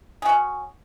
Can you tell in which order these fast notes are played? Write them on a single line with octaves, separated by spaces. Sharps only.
G#4 F#4 C#4